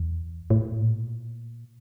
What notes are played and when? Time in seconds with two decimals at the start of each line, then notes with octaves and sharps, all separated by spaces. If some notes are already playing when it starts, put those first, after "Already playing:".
Already playing: E2
0.50 A2
0.81 A#2